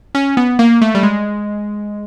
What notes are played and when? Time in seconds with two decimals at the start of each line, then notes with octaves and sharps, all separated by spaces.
0.15 C#4
0.37 B3
0.59 A#3
0.81 A3
0.95 G3
1.03 G#3